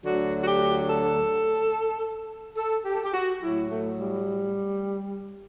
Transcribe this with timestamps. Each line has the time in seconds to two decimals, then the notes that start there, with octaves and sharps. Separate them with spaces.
0.03 D2 D3 F#3 F#4
0.41 F#4
0.45 G4
0.88 A4
2.57 A4
2.85 G4
2.94 A4
3.03 G4
3.13 F#4
3.41 A2 F#3 E4
3.69 A3
3.98 G3